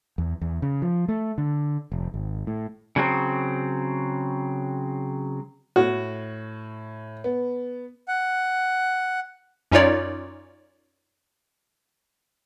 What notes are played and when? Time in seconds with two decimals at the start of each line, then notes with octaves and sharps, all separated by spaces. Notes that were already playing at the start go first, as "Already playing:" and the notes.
0.18 E2
0.41 E2
0.62 C#3
0.82 F3
1.08 A3
1.38 D3
1.92 F1
2.14 G#1
2.47 A2
2.96 C#3 F#3 C4
5.76 A2 F#4
7.24 B3
8.08 F#5
9.71 F#2 C#4 D#4 F4 C#5 D5